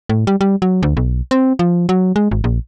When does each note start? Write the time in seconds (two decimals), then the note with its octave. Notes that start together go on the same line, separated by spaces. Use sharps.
0.09 A2
0.27 G3
0.41 G3
0.62 F#3
0.83 D2
0.97 B1
1.31 C4
1.59 F3
1.89 F#3
2.16 G#3
2.31 G#1
2.44 A#1